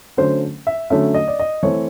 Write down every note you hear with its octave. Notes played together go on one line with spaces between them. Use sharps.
D3 F#3 A3 C#4 C5
E5
D3 F#3 A3 C#4 E5
D#5
D5
D#5
E3 A3 C4 C#5